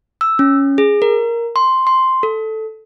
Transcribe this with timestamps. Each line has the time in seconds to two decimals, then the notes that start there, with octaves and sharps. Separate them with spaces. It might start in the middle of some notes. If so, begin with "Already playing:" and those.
0.21 E6
0.39 C#4
0.78 G#4
1.02 A#4
1.56 C6
1.87 C6
2.23 A4